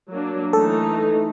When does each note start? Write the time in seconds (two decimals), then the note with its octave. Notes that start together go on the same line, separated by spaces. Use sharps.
0.11 F#3 A#3 D4
0.53 E3 A3 D#4 A4